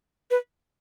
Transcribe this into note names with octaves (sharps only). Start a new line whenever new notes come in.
B4